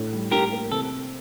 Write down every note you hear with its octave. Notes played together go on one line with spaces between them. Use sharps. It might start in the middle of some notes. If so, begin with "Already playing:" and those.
Already playing: A2
G3
A2 G4 A#4
A#3
C3 A4